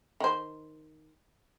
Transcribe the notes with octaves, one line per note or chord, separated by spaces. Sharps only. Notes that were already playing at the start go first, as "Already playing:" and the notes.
D#3 C5